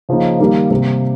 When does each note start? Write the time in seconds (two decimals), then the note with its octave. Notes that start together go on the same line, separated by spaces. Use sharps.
0.09 C#3 F3 A#3 D#4
0.39 D#3 G3 A#3 D#4 A#4
0.70 C3 G3 A#3